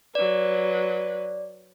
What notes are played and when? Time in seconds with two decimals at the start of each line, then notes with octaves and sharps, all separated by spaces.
0.15 F#3 B4 D5